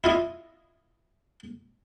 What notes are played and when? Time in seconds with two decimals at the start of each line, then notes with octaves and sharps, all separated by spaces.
0.04 E4 F4 D#5